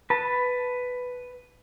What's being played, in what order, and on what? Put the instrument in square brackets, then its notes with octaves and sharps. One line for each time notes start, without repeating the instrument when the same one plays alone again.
[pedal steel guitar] B4 A5